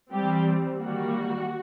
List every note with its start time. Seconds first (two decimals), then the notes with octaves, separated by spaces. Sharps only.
0.11 E3 G3 C4 G4
0.80 D#3 G3 A#3 F#4